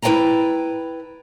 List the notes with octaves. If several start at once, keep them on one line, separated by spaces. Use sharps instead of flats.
E4 B4 D#5 G5 A5 A#5